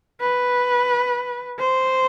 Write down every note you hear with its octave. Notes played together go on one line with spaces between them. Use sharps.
B4
C5